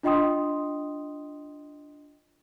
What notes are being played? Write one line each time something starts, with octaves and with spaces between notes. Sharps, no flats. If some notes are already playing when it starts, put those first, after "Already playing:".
D4 F4 D#5 G5 C6 D#6